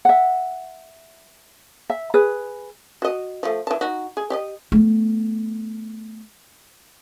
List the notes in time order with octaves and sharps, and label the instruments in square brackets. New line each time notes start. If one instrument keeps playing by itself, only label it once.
[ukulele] E5 F#5
E5
G#4 B4
[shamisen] F#4 D#5
F3 A3
E3 A5
D#4 F#4
G#4
G4 D5 D#5
[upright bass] A3 B3